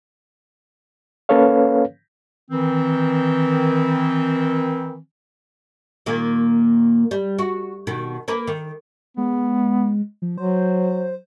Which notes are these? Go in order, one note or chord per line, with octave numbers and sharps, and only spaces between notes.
A#3 C#4 A4 B4 C#5 F5
D#3 E3 C4
A#2 D#3 A#3
G3
F#4
B2 D#3
A#3 A#4 B4
D#3
G#3 B3
F3
F#3 C5